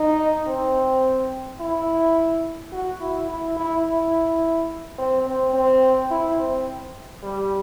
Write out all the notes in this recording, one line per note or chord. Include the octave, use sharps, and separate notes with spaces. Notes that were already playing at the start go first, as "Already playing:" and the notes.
Already playing: D#4
C4
E4
F#4
E4
E4
E4
E4
C4
C4
C4
E4
C4
G3